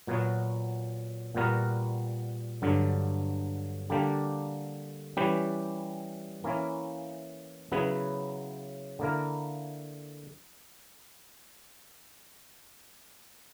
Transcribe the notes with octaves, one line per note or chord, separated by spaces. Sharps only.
A#2 F#3 B3 F#4
A#2 G3 B3 F#4 A#4
G2 D3 F#3
D3 G3 A#3 D4 G4
E3 G3 C#4 G4 B4
E3 A#3 C#4 E4
C#3 F#3 B3 E4 B4
D3 A#3 E4 A#4